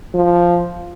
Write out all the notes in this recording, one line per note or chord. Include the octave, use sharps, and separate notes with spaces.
F3